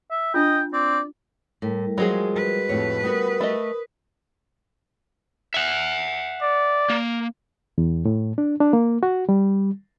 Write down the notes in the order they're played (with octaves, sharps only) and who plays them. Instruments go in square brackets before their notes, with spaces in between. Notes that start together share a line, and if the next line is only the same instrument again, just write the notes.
[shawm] E5
[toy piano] D4 F4 [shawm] D#5 [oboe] G5
[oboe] C4 [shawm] D5
[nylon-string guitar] A2 [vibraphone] G3 A#4
[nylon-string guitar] F3 [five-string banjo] F#3 G#3 G#4
[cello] B4
[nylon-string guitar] F2 A2 C#5
[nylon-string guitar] G3 B3 F#4 [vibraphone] A#4 D#6
[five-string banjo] A3 D#5
[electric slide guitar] E5 F#5
[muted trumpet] D5
[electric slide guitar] A#3
[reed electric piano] E2
A2
D4
D4
A#3
F#4
G3